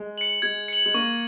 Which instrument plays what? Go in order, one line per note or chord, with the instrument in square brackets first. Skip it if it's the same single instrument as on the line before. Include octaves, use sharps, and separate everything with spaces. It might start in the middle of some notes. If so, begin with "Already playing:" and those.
Already playing: [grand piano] G#3
[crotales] C#7 F#7
[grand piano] G#3 [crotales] G#6
[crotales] C#7 F#7
[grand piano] G#3
[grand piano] A#3 [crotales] C#6